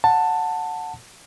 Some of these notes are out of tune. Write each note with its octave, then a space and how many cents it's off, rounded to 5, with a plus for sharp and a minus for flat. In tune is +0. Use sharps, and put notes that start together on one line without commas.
F#5 -15 A5 +10